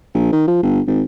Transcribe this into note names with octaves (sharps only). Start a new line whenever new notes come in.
A#1
D#3
F3
G1
G#1